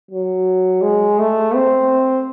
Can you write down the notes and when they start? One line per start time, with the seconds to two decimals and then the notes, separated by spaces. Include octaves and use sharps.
0.11 F#3
0.82 G#3
1.19 A3
1.54 C4